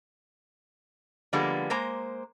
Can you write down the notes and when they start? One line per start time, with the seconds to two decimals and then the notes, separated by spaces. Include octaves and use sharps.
1.33 D3 F3 G3 G#3 A#3 B3
1.70 G#3 A#3 C5 A#5